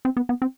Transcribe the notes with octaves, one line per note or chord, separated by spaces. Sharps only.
C4
B3
B3
C4